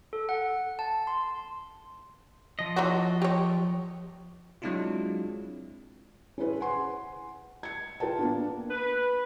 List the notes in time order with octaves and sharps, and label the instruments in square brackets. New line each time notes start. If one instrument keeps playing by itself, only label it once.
[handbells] A4
F#5
A5
C6
[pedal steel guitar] F3 D#5
[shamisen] E3 F#3 F#4
G4 C#5
[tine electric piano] F#3 G#3 C4 D4 E4 F4
[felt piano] C#4 E4 G#4 B4 C5
F#5 G#5 C6
G#6 C#7
F4 A#4 B4 G5 A5
A#3 B3 D4
[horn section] B4